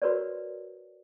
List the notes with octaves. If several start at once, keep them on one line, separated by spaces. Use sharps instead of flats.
F#4 A#4 B4 C#5 D5